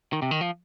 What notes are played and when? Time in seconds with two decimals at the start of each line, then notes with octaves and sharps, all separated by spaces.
0.13 D#3
0.22 C3
0.31 D#3
0.41 F3